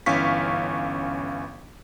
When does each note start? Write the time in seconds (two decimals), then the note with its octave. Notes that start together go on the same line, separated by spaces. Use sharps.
0.06 G1 E3 C#4 F5 C#6 B6